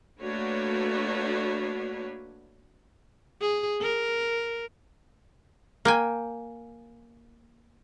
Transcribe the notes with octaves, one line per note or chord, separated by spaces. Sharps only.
A3 A#3 D4 F#4 B4 C#5
G#4
A#4
A#3 G5 G#5